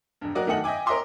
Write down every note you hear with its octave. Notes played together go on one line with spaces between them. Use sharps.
E1 G2
F#3 A#3 F#4 A#4 D5 D#5
D#3 A3 D#5 F#5 F#7
D#5 E5 G5 G#5 D6
A#4 C#5 D#5 E5 C6 D6